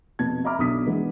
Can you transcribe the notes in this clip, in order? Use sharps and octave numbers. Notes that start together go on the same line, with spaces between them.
F1 B2 A5 G#6
D#5 E5 A#5 B5 D6 F6
B1 D3 D#6 B6
D3 E3 G#3 B3